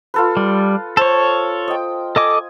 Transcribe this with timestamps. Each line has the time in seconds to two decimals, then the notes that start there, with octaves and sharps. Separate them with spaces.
0.14 F4 A4 B4
0.37 G3
0.97 A4 C5 C#5
1.68 D#5 G5
2.16 A4 D#5 G#5 D6